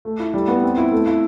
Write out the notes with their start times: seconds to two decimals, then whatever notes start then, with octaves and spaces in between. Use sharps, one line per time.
0.05 A3
0.20 E4
0.34 G3
0.48 B3
0.63 C4
0.77 E4
0.92 A3
1.07 E4